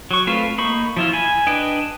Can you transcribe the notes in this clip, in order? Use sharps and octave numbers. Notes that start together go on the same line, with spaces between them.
F#3 C#6
A3 C4 F4 B4 F5
A#3 D#4 B5 C#6
F3 E4 F4
G#5 B5
D4 B4 D#5 G5